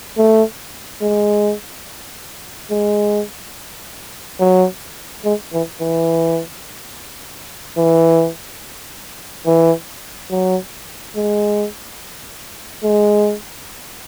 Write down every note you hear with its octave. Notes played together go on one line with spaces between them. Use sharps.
A3
G#3
G#3
F#3
G#3
E3
E3
E3
E3
F#3
G#3
G#3